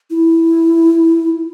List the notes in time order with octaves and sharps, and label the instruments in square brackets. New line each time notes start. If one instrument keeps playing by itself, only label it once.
[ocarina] E4